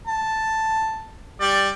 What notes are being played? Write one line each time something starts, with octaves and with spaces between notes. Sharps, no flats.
A5
G3 D5